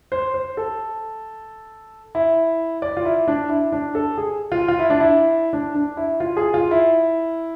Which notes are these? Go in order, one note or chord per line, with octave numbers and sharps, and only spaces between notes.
C5
C5
A4
E4
D5
F4
E4
D4
E4
D4
A4
G#4
F4
F4
E4
D4
E4
D4
D4
E4
F4
G#4
F4
E4